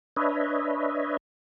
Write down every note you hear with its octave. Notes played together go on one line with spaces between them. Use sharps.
D4 B4 C#5 D#5 E5